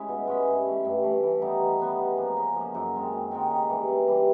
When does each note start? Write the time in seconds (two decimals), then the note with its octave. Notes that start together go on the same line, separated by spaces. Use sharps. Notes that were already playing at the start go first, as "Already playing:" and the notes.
Already playing: G#3 C#4 E4
0.09 B2
0.27 G#3 C#4 E4
0.46 G2
0.66 E3 A3
0.85 G2
1.03 E3 A3
1.23 E3
1.41 G3 B3 D#4
1.61 E3
1.79 G3 B3 D#4
1.99 C#3
2.17 F3 A#3
2.36 C#3
2.55 F3 A#3
2.74 F#2
2.94 D#3 G#3 C4
3.13 F#2
3.31 D#3 G#3 C4
3.50 C#3
3.69 E3 G3
3.88 C#3
4.08 E3 G3